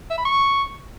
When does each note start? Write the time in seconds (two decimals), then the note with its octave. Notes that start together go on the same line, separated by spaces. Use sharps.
0.10 E5
0.18 B5
0.25 C#6